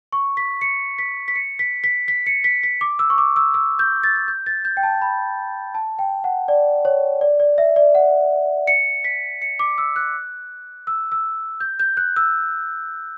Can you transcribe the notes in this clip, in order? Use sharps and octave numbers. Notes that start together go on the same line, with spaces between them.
C#6
B6
C#7
B6
B6
C#7
B6
B6
B6
C#7
B6
B6
D6
E6
C#6
D6
E6
E6
G6
A6
A6
G6
A6
G6
G5
A5
B5
A5
G5
F#5
D5
C#5
D5
D5
E5
D5
F#5
C#7
B6
C#7
D6
E6
F#6
E6
E6
G6
G6
F#6
E6